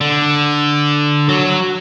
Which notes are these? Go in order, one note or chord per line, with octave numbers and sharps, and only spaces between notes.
D3
F#3